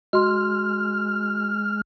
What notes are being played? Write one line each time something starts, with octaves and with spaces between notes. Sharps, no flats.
G#3 F#4 C6 F6